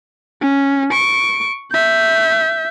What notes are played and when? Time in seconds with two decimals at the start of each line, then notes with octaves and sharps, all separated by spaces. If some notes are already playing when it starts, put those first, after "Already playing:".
0.41 C#4
0.92 C#6 D7
1.72 E5 G6